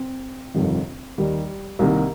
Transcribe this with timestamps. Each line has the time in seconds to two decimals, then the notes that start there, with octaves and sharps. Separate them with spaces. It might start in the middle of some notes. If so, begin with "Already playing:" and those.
Already playing: C4
0.54 G1 F2 C3 D#3
1.18 D#2 D#3 G3
1.79 C2 C3 D#3 A#3